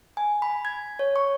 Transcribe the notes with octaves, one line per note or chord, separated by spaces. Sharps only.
G#5
B5
G#6
C#5
C#6